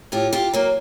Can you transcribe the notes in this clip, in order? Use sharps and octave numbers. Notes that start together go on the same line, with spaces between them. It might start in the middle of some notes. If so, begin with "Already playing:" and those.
A2 F4 G4
F4 G4
F#3 A#3